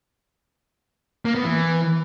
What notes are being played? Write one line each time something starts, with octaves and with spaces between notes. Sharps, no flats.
A#3
B3
E3